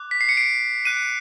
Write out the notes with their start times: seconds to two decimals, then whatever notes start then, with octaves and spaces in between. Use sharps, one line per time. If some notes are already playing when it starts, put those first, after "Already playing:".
Already playing: D6 F#6
0.11 B6
0.21 C7
0.29 C#7
0.37 C7 D7
0.85 D6 F#6 D#7
0.97 D7